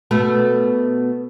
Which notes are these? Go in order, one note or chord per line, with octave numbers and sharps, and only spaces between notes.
B2 A3 B3